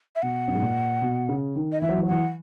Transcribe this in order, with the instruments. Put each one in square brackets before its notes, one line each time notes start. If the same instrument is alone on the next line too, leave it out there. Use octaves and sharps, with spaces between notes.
[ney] E5
[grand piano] B2 [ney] F#5
[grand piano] F#2
G#2
A#2
B2
C#3
D#3
[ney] D#5
[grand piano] E3 [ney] E5
[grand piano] F#3
E3
F#3
[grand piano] E3 [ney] F#5